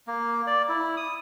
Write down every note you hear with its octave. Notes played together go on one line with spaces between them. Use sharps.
A#3
D5
E4
D#6